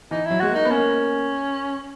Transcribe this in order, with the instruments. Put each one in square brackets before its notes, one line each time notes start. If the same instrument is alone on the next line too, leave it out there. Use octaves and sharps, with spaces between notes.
[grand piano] E3 [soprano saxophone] D#4
[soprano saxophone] E4
[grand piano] F#3
[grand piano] G#3 [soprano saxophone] F#4
[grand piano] A#3
[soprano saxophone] D#4
[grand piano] B3
[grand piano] A#3 [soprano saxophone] C#4